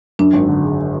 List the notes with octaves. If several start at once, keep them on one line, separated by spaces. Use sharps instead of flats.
F#2 D4
G#1
D3
G#3